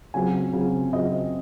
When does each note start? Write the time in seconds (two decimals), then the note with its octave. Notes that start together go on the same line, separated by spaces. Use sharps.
0.14 C#3 F#3 C4 F4 G#5
0.53 C#3 F#3 C4 F4
0.93 C#3 F#3 C4 F4 D#5